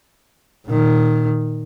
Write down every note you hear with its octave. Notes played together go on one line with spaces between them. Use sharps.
A#2 D#3